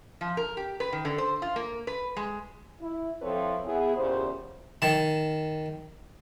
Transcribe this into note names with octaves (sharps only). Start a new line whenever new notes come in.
F3
A#4
G4
B4
D#3
D3
C5
F4
A#3
B4
G#3
E4
F3 C4 E4 A4 B4 C#5
B3 E4 G#4
E2 A#2 C#3 G4 C5
D#3 A5